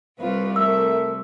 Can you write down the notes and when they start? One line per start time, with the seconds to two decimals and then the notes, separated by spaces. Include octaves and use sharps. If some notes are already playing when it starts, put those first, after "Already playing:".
0.19 C2 F4 B4
0.56 A3 A#4 E5 E6